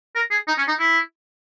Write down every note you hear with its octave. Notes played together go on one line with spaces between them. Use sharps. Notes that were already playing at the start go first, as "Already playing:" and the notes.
A#4
G#4
D#4
C#4
D#4
E4